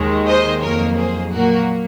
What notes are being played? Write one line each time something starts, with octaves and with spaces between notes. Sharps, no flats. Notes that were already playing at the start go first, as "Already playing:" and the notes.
Already playing: D#2 D#3 G#3
C5 D#5
F2 D#3 F#3 A#3 A#4 C#5
G#4 C5
A#2 F#3 A#3 F#4 A#4